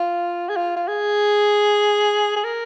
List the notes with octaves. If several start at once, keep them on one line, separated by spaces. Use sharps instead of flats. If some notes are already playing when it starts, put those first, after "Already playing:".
Already playing: F4
G#4
F4
F4
G#4
G#4
A#4